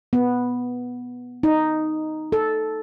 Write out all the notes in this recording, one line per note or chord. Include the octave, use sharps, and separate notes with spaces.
B3
D#4
A4